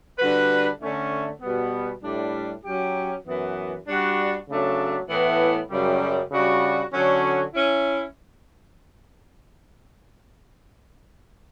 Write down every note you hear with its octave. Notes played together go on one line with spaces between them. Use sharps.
D3 G3 D4 F#4 B4
D3 A3 C#4
B2 G3 B3
A2 G3 D4
F#3 C#4 G4
F#2 E3 B3
G3 D4 F#4
C#3 F#3 A3 D4
A2 E3 B3
F#2 C#3 G3
C#3 G3 D4 F#4
D3 F#3 C#4
C#4 E4